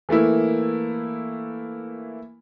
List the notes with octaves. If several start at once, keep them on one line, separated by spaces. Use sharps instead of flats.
E3 A3 A#3 E4